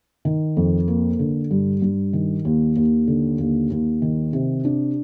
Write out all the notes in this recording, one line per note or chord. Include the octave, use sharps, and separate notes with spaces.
D#3
F2
A#3
D3
G2
G2
D#3
D#2
D#2
D3
D#2
D#2
D#3
C3
D4